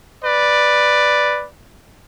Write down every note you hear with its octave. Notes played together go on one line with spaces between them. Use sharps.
B4 D5